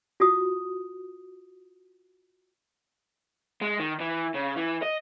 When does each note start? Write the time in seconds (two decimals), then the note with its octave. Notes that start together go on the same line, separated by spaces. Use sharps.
0.20 F4 F#4 D#6
3.61 G#3
3.79 D#3
4.00 E3
4.34 C#3
4.56 E3
4.82 D#5